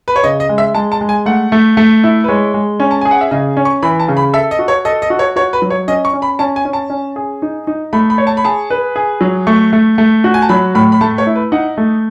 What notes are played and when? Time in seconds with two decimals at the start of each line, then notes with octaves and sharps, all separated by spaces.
0.08 B4
0.16 C#5
0.23 C#3 D#5
0.40 D#5
0.49 G#3
0.58 E5
0.75 G#3 A5
0.92 A5
1.01 G#3
1.09 G#5
1.26 A3 F#5
1.52 A3
1.77 A3
2.04 E4
2.24 B4
2.28 G#3 C#5
2.54 G#3
2.80 C#4
2.91 A5
3.01 G#4 G#5
3.11 F#5
3.21 E5
3.31 C#3 D#5
3.57 C#4
3.65 C#6
3.83 E3 B5
4.00 A5
4.08 C#3
4.17 B5
4.33 A4 E5
4.51 D#5
4.59 F#4
4.68 C#5
4.85 A4 D#5
5.02 D#5
5.10 F#4
5.19 C#5
5.36 F#4 C#5
5.53 B4
5.62 F#3
5.70 C#5
5.88 C#4 D#5
6.05 C#6
6.13 C#4
6.22 B5
6.39 C#4 A5
6.56 G#5
6.65 C#4
6.73 A5
6.90 C#4
7.16 G#4
7.42 D#4
7.67 D#4
7.93 A3 B5
8.10 B5
8.18 C#5
8.27 A5
8.37 B5
8.45 G#4 A5
8.70 B4
8.96 G#4
9.21 F#3
9.47 A3 C#6
9.73 A3
9.98 A3
10.24 F#4
10.34 G#5
10.42 A5
10.49 F#3 B5
10.75 A2 B5
10.92 B5
11.01 A3 A5
11.18 C#5
11.27 E4
11.35 B4
11.52 D#4 F#5
11.77 A3